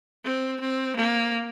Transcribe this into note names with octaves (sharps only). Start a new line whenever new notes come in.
C4
C4
A#3